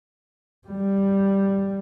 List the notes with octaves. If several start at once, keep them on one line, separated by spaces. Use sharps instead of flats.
G3